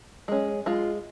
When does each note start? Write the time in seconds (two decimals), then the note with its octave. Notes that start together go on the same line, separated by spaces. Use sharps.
0.28 G#3 C#4
0.66 G#3 F4